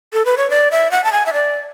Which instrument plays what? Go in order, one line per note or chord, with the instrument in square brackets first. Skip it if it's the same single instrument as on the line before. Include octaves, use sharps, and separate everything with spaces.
[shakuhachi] A4
B4
C#5
D5
E5
F#5
A5
G#5
E5
D5